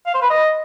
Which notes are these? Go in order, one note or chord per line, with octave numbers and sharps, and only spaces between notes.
F5
C5
B4
D#5